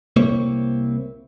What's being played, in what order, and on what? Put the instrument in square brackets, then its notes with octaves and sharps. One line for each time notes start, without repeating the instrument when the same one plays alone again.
[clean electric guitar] C2 A#3 C4 E4 C#5